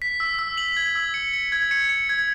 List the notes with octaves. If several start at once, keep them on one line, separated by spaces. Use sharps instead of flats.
B6
E6
E6
F#7
G#6
E6
C#7
C#7
G#6
C#7
C#7
G#6